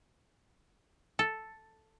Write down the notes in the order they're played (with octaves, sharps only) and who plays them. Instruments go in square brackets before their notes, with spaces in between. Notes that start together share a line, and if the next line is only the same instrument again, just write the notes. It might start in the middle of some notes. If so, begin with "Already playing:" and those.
[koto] A4